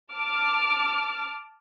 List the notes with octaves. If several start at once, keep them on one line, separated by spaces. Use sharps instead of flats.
A5 D6 F6